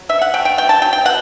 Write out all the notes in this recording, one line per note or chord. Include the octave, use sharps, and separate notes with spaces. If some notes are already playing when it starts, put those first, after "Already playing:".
Already playing: F#3
B2 E5
F#5
A3 G5
G5
B2 G5
A5
F#3 G5
G5
B2 F#5